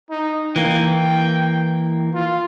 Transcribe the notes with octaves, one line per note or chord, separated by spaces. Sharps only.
D#4
E3 A#3 G5
F4